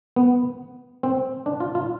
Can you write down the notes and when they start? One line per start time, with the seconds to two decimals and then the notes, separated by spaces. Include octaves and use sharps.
0.16 B3
1.03 C4
1.46 D4
1.60 F4
1.75 F4